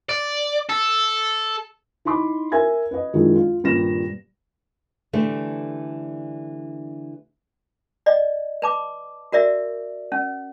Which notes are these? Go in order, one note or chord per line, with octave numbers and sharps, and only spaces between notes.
D5
A4
D#4 E4 B5 C6 D6
A#4 E5 G#5 G#6
B4 D#5
F#2 D#3 F3 G#3 D4 E4
F4
D#1 G2 A#2 G3 A#6 E7
D3 E3 G3 A3 D4
D5 D#5
B4 A5 D6
F#4 A#4 D5 E5
C#4